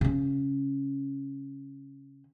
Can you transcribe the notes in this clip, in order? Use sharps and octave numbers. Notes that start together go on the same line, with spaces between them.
C#3 C#4